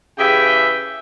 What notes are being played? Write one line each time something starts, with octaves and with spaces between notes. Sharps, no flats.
C#3 E3 G4 G#4 E5 G5